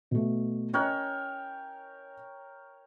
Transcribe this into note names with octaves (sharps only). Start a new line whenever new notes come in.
B2 A3
C#4 A#4 C#5 D#5 G5 F#6